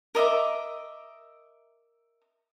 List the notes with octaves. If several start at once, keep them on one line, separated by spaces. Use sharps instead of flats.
A#4 D#5 E5 D6